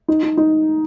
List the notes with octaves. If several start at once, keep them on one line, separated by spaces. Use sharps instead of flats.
D#4
D#4
D#4